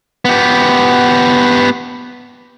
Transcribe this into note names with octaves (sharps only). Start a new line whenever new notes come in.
B3 G4